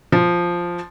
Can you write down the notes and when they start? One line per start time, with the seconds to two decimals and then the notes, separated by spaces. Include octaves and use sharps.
0.12 F3